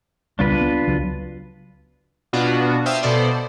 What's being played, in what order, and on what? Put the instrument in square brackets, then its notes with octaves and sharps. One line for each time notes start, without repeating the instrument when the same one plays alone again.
[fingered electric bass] C#2 G3 B3 [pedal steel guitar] D4 F4 B4
[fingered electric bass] B3
C#2 F#3
[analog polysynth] B2 B3 D4 F4 F#4
C5 E5 F5 G5 D#6 E6
B2 B3 A4 C5 D5